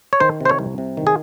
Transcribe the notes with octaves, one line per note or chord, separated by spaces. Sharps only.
C#5
D#3 C5
C3 C5
C#5
C2
C3
D#3
G#4